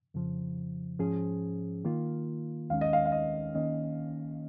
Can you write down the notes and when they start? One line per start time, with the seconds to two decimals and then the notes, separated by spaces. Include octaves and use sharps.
0.14 F2 C#3 F3
0.99 G#2 F3 C#4 G#4
1.84 D#3 A#3 F4
2.70 D#2 D#3 G#3 C#4 F5
2.81 D#5
2.93 F5
3.05 F5
3.12 D#5
3.55 D#3 A#3 C#4 D#5